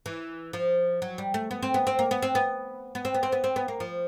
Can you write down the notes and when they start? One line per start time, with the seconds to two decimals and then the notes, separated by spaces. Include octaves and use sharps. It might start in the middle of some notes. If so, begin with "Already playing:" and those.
0.06 E3
0.53 F3
1.02 F#3
1.18 G3
1.34 A3
1.51 B3
1.63 C4
1.74 B3
1.87 C4
1.99 A#3
2.11 B3
2.22 C4
2.35 B3
2.95 B3
3.05 C4
3.14 B3
3.23 C4
3.32 B3
3.44 C4
3.56 B3
3.68 A#3
3.80 F3